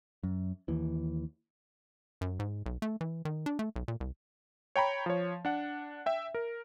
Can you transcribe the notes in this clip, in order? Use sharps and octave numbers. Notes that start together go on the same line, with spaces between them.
F#2
D#2 E3
F#2
G#2
B1
A3
E3
D#3
D4
A3
B1
A#2
C2
C#5 G5 A#5 B5
F3 C#5
D4 F#5
E5 G5
A#4